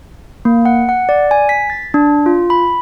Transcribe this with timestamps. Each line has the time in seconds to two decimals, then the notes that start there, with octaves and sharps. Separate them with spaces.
0.45 A#3
0.65 F#5
0.89 F#5
1.09 D5
1.31 G#5
1.49 B6
1.70 A6
1.94 D4
2.26 F4
2.50 B5